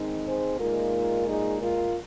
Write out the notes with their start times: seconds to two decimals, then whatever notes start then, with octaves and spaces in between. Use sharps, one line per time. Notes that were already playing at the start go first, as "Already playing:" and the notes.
Already playing: D#3 G#3 C4 D#4
0.26 G#4 C5
0.60 A#2 G#3 D#4 F4 A#4
1.28 D#4 G#4
1.62 F4 A#4